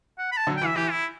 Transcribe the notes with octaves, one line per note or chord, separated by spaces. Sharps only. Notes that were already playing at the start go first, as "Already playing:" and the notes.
F#5
B5
A5
D3 F#3
E3 G5
E5
E3 G4
E4